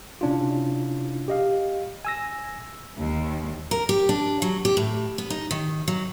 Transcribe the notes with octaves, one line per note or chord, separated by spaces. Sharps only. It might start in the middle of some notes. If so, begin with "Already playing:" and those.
C3 C#4 D4 E4 F4
G4 D#5 F5
G#5 E6 A#6
D#2
A#4
G4
D4
F#3
G4
A2
B3
D#4
D#3
F#3